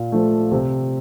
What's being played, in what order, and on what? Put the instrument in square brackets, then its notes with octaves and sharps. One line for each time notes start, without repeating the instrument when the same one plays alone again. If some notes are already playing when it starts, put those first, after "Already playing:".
Already playing: [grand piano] A#2
F3 A3
C3